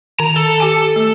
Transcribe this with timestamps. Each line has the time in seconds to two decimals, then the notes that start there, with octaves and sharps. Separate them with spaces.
0.20 D#3 A#5
0.36 A4
0.58 G4 G#5 A5
0.96 A3